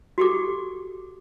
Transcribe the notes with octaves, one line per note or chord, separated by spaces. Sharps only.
F#4 G4 A4 D6